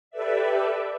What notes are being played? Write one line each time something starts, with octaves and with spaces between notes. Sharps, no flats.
G4 A4 B4 D5 E5